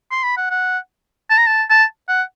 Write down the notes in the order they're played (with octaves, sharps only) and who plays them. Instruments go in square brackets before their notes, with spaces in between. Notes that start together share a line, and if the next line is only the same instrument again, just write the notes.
[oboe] C6
B5
F#5
F#5
A5
A#5
A5
A5
F#5